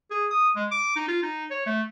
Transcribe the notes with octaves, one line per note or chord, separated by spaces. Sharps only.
G#4
D#6
G#3
D6
D#4
F4
D#4
C#5
A3